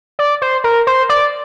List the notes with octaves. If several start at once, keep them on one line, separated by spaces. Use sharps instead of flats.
D5
C5
A#4
C5
D5